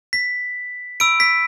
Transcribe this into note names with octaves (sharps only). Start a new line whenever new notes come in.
B6
B5 E6 D7
B6